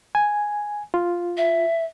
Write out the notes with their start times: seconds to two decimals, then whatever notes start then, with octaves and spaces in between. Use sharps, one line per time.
0.15 G#5
0.94 F4
1.37 E5